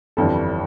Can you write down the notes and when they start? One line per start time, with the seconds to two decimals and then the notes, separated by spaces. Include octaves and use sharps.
0.17 G1 F2 E3 G3 A4